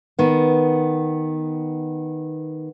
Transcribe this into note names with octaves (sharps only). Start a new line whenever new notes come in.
D#3 B3